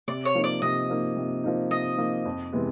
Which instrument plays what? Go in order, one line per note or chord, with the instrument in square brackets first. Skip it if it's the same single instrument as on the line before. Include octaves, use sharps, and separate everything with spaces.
[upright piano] C3 [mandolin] D5
[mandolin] C#5
[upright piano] F3 A#3 D#4
[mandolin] D5
[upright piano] C3 [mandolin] D#5
[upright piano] F3 A#3 D#4
C3
F3 A#3 D#4
[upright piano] C3 [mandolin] D#5
[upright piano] F3 A#3 D#4
F2
C3 E3 G#3 B3